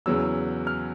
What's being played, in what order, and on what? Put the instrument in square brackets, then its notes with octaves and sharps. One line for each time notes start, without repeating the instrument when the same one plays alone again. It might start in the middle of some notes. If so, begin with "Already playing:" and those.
[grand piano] E2 C#3 F#3 B3 E6
F6